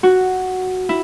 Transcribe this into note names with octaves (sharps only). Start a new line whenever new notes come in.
F#4
E4